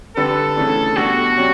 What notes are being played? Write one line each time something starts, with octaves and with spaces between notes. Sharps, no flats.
D3 G3 D4 G4 A4 B4
C#3 E3 A3 D4
B2 G3 D4 F#4
F#3 C#4 G4